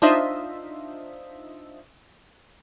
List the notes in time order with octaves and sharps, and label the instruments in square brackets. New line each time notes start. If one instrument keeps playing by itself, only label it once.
[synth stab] D4 D#4 F4 C5 D#5 E5